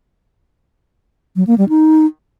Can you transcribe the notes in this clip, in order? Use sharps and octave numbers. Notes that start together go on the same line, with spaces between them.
F#3
A#3
G3
D#4